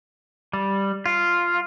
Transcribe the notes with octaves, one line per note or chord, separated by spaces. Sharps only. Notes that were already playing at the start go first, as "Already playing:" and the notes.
G3
F4